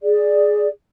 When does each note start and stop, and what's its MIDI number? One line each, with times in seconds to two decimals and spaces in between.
0.01 0.68 68
0.01 0.68 74